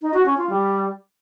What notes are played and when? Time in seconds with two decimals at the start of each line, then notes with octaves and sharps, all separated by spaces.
0.02 D#4
0.14 F#4
0.26 C#4
0.38 F4
0.50 G3